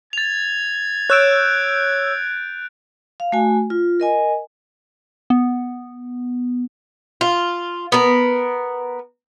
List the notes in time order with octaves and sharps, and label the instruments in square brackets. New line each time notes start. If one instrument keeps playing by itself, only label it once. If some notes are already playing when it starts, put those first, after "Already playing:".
[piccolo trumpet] G#6 [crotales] A6 F7
[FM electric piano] C#5 E6 [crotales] F#6 G6 D7
[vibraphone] F5
A3 F#4 G#5
F4
A#4 D#5 G#5
[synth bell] B3
[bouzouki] F4
B3 A#4